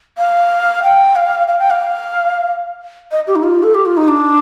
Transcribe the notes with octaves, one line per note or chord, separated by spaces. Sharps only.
F5
G5
F5
F5
G5
F5
D#5
G4
D#4
F4
A4
G4
F4
D#4
D4